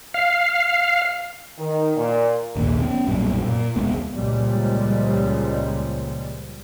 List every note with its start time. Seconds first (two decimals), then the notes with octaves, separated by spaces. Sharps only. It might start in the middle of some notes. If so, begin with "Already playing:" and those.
0.14 F5
1.58 D#3
1.95 A#2
2.56 A#1 D#2 A#2
2.81 B3 C#4
3.07 B1 F#2 A#2 G3
3.46 A#2
3.76 E1 C#2 G#3 B3
4.12 C#2 A#2 F3 G3 G#3